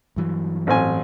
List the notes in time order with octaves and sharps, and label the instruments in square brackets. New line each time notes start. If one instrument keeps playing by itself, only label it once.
[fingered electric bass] G2 E3 F#3
[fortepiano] A1 C4 G#5